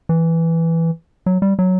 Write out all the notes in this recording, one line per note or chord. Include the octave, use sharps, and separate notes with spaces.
E3
F#3
G3
F#3